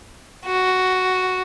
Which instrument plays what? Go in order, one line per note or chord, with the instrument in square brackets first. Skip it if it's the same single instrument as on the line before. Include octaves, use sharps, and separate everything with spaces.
[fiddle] F#4